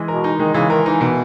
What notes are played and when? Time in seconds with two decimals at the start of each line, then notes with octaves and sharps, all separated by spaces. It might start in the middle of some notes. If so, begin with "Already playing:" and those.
Already playing: E3 G#3
0.08 B2 A#4
0.24 D#4
0.39 D#3 G#3
0.54 C#3 E3
0.70 D#3 A#4
0.86 E3 D#4
1.01 B2 E3